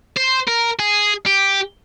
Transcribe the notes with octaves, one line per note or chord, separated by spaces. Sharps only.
C5
A#4
G#4
G4